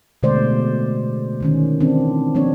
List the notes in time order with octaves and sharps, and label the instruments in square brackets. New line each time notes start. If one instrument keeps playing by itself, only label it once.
[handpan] B2 D3 G#3 A3 C5 D5
D3 D#3 C#4
E3 C4 D4
F3 A#3 C4 D4 C#5